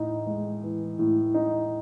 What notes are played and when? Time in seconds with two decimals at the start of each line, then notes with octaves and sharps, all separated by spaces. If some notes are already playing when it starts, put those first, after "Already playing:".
Already playing: A2 D#4
0.27 G#3
0.63 E3
0.99 A2
1.34 D#4